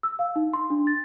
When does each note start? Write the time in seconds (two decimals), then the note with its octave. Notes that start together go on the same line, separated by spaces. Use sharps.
0.03 E6
0.19 F5
0.36 D#4
0.53 C6
0.70 D4
0.87 A6